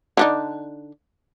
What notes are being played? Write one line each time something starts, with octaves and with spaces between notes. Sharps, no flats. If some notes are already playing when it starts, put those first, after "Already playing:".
D3 D4 D#4